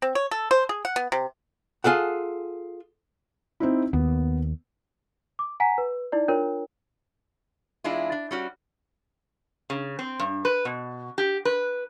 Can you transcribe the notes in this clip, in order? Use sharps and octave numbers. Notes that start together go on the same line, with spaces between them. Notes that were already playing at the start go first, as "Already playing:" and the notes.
C4
C#5
A4
C5
G#4
F#5
B3
C3
F4 G#4 A4 F#5
C4 D#4 E4
D#2 B3
D6
F#5 G#5 A#5 B6
B4
D#4 E4 D5
D4 F4 A#4 C#5
E2 G#3 D4 E4 F4
D4
G3 C#4 F#4 D5
C#3
C4
G2
B4
B2
G4
B4